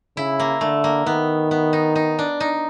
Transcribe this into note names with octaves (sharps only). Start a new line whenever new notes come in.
C#3 E4
A#3
D3 A3
A#3
D#3 B3
B3
D#4
D#4
D4
D#4